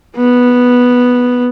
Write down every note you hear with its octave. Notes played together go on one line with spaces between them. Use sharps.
B3